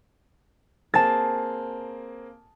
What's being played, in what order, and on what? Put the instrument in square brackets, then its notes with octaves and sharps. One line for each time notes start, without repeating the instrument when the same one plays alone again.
[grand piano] A#3 C4 G#4 [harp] A5 A6